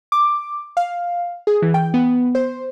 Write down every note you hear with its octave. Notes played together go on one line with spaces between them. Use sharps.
D6
F5
G#4
E3
G5
B3
C5